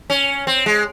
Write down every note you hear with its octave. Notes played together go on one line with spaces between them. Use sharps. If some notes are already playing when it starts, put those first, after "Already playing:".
C#4
C4
G#3